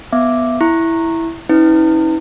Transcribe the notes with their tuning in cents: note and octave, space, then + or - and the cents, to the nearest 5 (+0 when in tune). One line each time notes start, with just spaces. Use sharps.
B3 +0 E5 +0 D6 +0
E4 +0 C#6 -20
C#4 +0 E4 -45 B4 +20